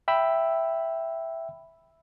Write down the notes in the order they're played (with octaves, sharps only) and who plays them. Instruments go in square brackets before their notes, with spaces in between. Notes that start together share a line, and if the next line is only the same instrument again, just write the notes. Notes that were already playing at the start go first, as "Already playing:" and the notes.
[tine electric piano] E5 G5 B5 E6